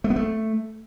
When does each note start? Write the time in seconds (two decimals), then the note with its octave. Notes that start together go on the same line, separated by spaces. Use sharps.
0.04 A3
0.10 B3
0.16 A3